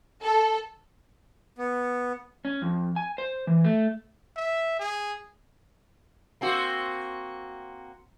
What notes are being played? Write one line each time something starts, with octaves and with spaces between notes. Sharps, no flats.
A4
B3
C#4
F2
G#5
C5
E3
A3
E5
G#4
A#3 C4 F#4